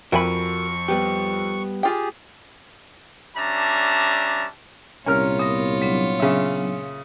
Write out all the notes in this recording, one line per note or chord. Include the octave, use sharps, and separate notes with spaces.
F2 F#4 A#4 G5 G#5 B5 C#6
G3 B3 G4
F4 G4 G#4 G5
G3 C#4 D4 E5 A5 A#5
C2 A#2 C#4 F4 A#4 C#5 F6
B3 A#4 D#6
F#3 B3 D4
C#3 E5